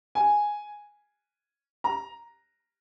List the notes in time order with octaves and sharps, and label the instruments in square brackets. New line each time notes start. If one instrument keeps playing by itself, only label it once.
[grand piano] G#5
A#5